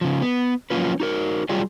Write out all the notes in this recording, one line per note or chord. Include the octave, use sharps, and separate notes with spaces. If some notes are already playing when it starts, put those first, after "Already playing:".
C#3 F3
B3
F3 F#3 A#3 C#4 F4 B4
D#4 F#4 A#4
F#3 G3 F4 G4 G#4 D5